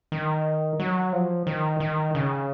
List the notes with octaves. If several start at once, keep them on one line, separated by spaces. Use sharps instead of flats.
D#3
F#3
F3
D#3
D#3
C#3